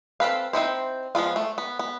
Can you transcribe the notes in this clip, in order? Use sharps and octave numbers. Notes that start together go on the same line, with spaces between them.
C4 A4 B4 F5
C4 D#4 E4 C5
F3 G#3 B3 F4
A3
B3
B3